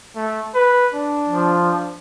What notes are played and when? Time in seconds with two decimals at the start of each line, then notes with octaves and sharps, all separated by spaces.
0.15 A3
0.54 B4
0.93 D4
1.29 F3
1.62 D4